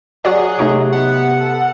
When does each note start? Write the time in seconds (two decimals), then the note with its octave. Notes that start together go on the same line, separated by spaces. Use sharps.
0.25 F#3 F#4 G#4 C#5 D5
0.59 C3 A3 D#4 C#5
0.93 B3 F#5
1.39 A4